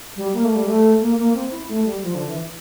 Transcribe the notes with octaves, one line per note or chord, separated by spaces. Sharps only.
G3
A#3
A3
G3
A3
A#3
A#3
C4
E4
A3
G3
F3
D3
E3